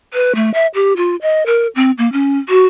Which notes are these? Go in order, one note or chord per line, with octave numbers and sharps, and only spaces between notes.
B4
A3
E5
G4
F4
D#5
A#4
C4
A#3
C#4
F#4